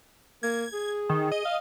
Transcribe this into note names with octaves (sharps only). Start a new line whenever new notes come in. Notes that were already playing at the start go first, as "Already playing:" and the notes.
A#3 G#6
G#4
D#3
D#5
F5